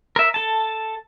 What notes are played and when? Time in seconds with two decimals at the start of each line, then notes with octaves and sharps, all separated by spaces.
0.16 A#4 E5
0.34 A4 A5